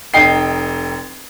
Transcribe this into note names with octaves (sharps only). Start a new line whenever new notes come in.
F1 D#4 G5 C7